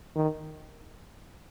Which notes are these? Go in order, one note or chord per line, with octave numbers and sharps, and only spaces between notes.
D#3